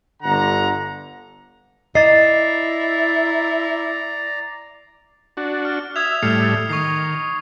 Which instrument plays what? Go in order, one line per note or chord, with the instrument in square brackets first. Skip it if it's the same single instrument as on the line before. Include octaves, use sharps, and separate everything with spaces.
[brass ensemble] G1 D3 F#5 A#5
[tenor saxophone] E4 [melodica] D5 A#5 [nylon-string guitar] D#5 [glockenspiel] A6 C7
[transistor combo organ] D4 F#4
[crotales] F6
[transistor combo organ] E5 [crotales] D#6 G#6 F7
[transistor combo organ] A2 G3 A3 [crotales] F6 C7 C#7
[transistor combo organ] D#3 [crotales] C#6 D#6 C7